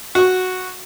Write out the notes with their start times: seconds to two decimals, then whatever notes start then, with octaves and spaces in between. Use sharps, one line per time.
0.15 F#4 C#6